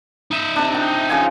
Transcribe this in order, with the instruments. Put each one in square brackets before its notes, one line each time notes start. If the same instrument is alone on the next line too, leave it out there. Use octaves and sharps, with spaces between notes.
[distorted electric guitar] D#4 E5
[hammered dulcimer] C3 D4
G5
C#3 F3 G#5